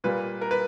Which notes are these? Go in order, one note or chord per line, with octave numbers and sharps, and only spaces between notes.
A#2 G3 A#3 B4
A#4
B4